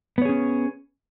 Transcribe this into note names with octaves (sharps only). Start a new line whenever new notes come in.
B3 C#4 G#4 C#5